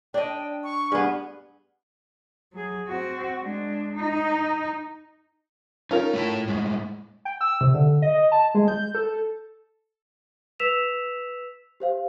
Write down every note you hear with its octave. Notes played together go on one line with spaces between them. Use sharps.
D4 D#5 G5
C#6
G2 B3 G#4
F#3 G#4
C4 F#4
G#3 D4
D#4
C#4 D#4 F4 A#4
A3 E4 A5
A2 G#3
G5
E6
C3
D3
D#5
A5
G#3
G6
A4
B4 E6 B6 E7 F7
G4 C5 F5